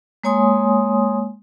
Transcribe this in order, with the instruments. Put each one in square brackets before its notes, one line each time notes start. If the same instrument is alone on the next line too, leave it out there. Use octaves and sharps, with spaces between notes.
[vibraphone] G#3 A#3 C#5 G#5 C6 D#6